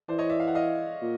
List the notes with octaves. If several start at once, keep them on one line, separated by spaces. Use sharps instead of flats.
E3 C5 D5
C#5 D#5
D5 E5
F5
F#5
D#5 F5
A#2